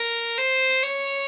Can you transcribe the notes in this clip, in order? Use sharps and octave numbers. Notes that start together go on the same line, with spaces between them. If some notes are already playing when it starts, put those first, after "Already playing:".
Already playing: A#4
C5
C#5